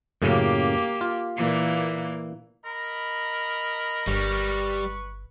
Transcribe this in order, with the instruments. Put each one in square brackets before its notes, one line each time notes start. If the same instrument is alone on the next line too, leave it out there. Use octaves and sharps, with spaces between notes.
[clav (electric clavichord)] F#2 A2 C#3 [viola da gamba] A#3 G4
[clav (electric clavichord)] F4
[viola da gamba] A#2 E3 A#3
[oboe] A#4 [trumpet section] D#5 A#5 B5
[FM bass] G1 [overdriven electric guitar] G3 [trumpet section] B4 C#6